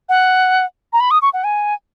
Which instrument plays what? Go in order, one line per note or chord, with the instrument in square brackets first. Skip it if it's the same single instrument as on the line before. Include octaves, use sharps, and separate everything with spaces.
[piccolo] F#5
A#5
B5
D#6
C#6
F#5
G#5